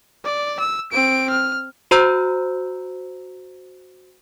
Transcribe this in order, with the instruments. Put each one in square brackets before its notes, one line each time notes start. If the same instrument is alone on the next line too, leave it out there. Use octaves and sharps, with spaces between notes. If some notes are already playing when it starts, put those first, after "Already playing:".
[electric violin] D5
E6
C4 D7
F6
[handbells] F#4 C5 A#5 E6 G6